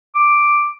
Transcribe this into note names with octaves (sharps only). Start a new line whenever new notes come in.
D6